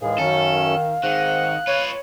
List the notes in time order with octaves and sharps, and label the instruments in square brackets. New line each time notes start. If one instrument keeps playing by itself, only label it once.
[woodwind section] D#2 A2 [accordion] E3 G#3 G#4 [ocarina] F5
[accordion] F#2 C#4 [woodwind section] D#3 [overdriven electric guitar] A4
[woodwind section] G#2 C4 F#5 [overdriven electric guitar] D#3 [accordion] F#6
[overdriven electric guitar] F4 B4 [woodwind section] C#5